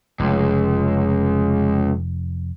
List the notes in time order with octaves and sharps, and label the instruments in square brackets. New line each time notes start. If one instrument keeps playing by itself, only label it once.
[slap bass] F1 [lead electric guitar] C#2